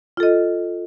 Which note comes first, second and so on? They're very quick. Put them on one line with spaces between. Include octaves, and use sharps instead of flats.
F4 A4 D#5